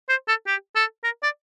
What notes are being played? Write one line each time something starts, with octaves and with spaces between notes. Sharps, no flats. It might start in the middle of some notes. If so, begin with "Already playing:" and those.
C5
A4
G4
A4
A#4
D5